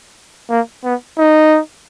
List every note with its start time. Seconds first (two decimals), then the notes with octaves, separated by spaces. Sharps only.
0.50 A#3
0.84 B3
1.18 D#4